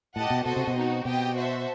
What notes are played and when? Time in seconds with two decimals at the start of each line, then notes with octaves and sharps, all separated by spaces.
0.16 A2 G4 D#5 F#5 A5
0.30 B2
0.45 B2 F#4 A4 C5 D#5
0.56 C3
0.67 B2
0.76 C4 D#4 F#4
1.05 B2 G4 D#5 G5
1.36 F#4 C5 E5 A5